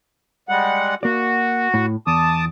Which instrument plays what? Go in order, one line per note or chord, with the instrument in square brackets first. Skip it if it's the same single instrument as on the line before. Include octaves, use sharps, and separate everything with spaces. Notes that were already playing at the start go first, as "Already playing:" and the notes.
[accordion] G3 G#3 F#5
[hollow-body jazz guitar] A#3 D5 [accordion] F#4
[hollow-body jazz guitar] A2
[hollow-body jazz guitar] E2 [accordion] A5 D6 D#6